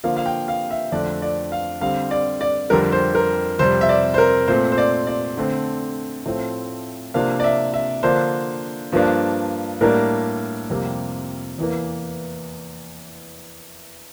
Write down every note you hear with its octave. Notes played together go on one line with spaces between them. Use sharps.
D3 F3 A#3 F5
F5
G5
F5
E5
F2 D3 A3 D4 D5
D5
F5
D3 G3 C4 F5
D5
D5
F2 D3 G3 A#4
C5
A#4
F2 C3 G3 C5
E5
D5
C5
A#4
A#2 A3 C4 C5
C5
D5
D5
D3 A3 C4
A2 F3 A3 C4
C3 F3 A#3 D4 F5
D5
E5
E5
D3 F3 A#3 D4 C5
G2 F3 A#3 D4
A2 G3 A#3 D4 A#4
F2 C3 G3 A#3
E2 E3 A#3